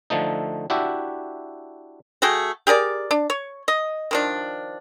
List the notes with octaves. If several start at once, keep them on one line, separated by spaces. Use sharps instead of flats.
D3 F3 A3 D#4
D4 E4 F#4 G4 E5
A3 F#4 G#4 G5
G4 G#4 A#4 D5
D4
C#5
D#5
D#3 F3 D4